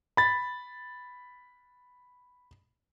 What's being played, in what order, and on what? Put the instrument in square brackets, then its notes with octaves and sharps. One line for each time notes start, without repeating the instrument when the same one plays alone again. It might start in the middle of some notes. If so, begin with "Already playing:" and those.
[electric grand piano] B5 A6